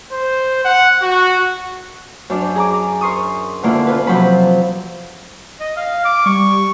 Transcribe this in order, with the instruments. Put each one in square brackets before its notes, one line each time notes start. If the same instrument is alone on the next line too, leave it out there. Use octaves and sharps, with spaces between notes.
[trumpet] C5
F#5
F#4
[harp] F#2 D4
G#4 A#5 D6
A#4 C6 C#6 D#6
B2 D3 A#3 E4 F4
C#4 F4 B4
C3 F3 F#3 B5
[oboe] D#5
F5
D6
[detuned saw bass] G3 [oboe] C#6